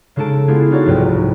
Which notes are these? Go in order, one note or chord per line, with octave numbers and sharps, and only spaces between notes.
C#3 G#3 D#4 A4 A5 D7
G#3 B3 E4 F4 G4 G#4
D#4 F4 F#4 C#5 D5
F1 C2 G#2 F#3 B4 G5